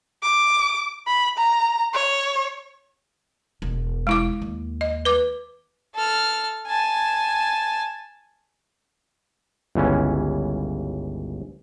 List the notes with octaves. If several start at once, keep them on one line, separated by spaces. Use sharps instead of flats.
D6
B5
A#5
C#5
E1
G#3 E4 D6
D#2
D#5
B4 D6
A4 F6
G#5 A5
G1 C#2 E3 C#4